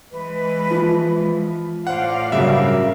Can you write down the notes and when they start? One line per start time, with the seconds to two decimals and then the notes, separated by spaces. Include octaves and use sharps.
0.12 E3 G#3 B4
0.71 F3
1.87 A2 C5 D5 F5 F#5
2.32 G2 C#3 F#3 A#4 E5